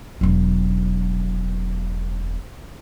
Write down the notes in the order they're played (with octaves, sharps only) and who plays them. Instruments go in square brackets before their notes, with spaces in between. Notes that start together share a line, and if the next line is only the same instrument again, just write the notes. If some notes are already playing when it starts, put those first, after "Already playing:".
[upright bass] E1 F#3